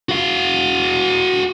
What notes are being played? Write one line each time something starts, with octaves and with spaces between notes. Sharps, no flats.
F#4 F5